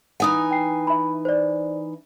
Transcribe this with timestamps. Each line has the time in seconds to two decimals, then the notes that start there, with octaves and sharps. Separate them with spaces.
0.20 E3 D#4 F#5 G#5 D#6
0.51 G5 C7
0.87 E5 B5
1.25 C5 D5